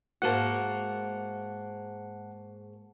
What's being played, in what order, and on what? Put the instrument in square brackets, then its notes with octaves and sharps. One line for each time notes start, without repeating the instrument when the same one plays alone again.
[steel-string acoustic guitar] G#2 A#3 F#4 [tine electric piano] F#5 A5